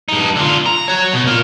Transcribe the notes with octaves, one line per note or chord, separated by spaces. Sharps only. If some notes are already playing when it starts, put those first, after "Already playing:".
G2 D#4
D3 F4
A#5
F#4 C#5
B2
A#3 F4